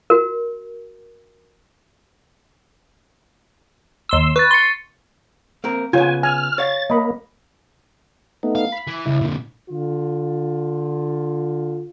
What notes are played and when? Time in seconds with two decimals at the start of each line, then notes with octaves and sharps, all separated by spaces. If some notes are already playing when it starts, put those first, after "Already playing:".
0.10 F#4 A#4
4.09 D#2 C6 E6
4.36 B4 C#6 A6
4.51 C6 A6 C#7
5.64 A#3 C4 A#4
5.93 C#3 B3 F4 C#5 G#5
6.23 G#5 F6
6.58 C#5 F5 A6
6.90 A#3 D#5 B5
8.43 A3 B3 D#4
8.55 F5
8.72 B5
8.87 E3
9.06 C#2 E4
9.21 A#2 D3
9.69 D3 F4